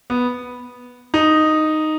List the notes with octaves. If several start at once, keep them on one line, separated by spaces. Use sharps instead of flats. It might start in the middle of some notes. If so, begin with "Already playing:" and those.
B3
D#4